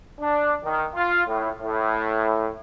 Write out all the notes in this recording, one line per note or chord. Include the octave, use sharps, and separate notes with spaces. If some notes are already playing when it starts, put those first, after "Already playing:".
D4
D#3
F4
A2
A2